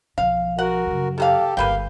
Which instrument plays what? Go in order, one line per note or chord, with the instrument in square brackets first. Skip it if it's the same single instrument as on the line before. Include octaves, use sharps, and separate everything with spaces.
[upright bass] B1 F3 [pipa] F5
[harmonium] F#4 A#4 [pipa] F#5
[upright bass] F#2 C#3
[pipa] D#3 A#3 F5 [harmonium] G4 A4
[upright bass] G1 G2 [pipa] A#3 B4 G5 [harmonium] F5